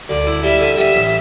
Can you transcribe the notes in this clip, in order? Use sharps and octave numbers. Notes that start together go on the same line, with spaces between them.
D2 D5
E4
G3 E5
D3
G3 E5
A1